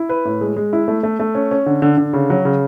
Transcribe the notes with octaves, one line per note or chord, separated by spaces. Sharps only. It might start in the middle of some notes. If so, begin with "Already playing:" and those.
Already playing: E4
B4
A2
G#3
G#3
E4
A3
A3
A3
C#4
C#4
D3
D3
D3
C#3
F#3
C#3